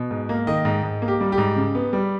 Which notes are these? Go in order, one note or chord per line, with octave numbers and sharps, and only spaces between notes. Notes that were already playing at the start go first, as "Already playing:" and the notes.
Already playing: B2
G#2
A#3
D#3 D#5
G#2
G#2
A#3
G4
G3
G4
G#2
C#3
B3
G3